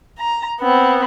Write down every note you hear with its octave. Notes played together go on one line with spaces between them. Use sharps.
A#5
B3 C4